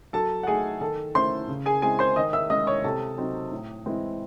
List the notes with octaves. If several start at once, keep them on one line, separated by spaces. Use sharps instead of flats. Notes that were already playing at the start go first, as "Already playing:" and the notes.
F#3 A4 A5
F#5
A3 D#4 G#4 G#5
D#3 A4 A5
A3 C#4 E4 C5 C6
C#3
G#4 G#5
G#3 C4 E4 G#4 G#5
C5 C6
D#3 D#5 D#6
E5 E6
G#3 C#4 D#5 D#6
C#5 C#6
C3 A4 A5
F#3 C4 D#4
A2
E3 G#3 C4 E4